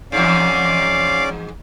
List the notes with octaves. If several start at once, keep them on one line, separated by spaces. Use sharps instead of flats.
E2 G#2 C#4 D5 F5 D6